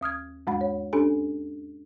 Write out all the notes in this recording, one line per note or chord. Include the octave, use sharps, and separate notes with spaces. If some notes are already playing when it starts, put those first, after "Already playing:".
D#2 D#6 F6 G#6
E2 G#2 G#3 F#5 B5
C#5
C#4 D4 G4 A4 G#5